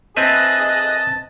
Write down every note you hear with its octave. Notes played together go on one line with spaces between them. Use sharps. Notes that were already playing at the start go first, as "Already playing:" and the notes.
C4 G#4 B4 D#5 E5 A5 F#6